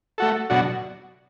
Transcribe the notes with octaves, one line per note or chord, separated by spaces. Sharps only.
A3 F#4 A4
B2 F#3 D4 F#4